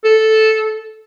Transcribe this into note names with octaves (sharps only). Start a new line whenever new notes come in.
A4